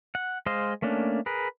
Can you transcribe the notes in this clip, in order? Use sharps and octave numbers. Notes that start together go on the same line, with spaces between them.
F#5
G#3 C5 D#5 F5
A3 A#3 C#4 D4
G#4 A#4 B4